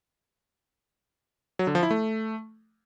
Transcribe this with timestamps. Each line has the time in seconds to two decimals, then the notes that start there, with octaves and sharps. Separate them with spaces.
1.59 F#3
1.67 D3
1.75 F3
1.83 E4
1.91 A3